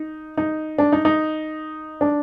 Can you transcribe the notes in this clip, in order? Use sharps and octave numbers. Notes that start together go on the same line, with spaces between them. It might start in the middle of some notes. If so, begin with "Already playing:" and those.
Already playing: D#4
D#4
D4
D#4
D#4
D4